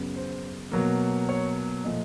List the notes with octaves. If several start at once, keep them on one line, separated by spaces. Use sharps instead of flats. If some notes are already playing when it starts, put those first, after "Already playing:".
Already playing: F#2 C#3 F#3 B3
C5
B2 F#3 A#3
C#5
A#2 F3 A3 D#5